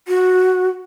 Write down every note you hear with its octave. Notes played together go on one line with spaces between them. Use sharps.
F#4